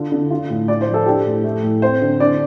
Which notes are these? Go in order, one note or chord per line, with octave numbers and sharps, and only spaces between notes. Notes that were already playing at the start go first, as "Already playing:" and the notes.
Already playing: D3 F4
D3
F4
A2
F4 D5
C5
F3
A4
D4 G4
A2
A3
A2
C4 C5
D3
D4 D5